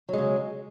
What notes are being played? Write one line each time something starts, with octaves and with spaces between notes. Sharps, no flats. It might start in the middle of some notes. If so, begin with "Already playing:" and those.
C#3 F#3 G#3